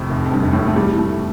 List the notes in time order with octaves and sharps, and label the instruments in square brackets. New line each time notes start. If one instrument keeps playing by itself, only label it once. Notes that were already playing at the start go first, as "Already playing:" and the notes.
Already playing: [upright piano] F2 A2 [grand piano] C3
[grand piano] F1
F2
[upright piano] G2
[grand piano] F1
[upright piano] A2
[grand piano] F1
[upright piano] A3
[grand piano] E3 [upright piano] G3
[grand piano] E3
[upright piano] A3
[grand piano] E3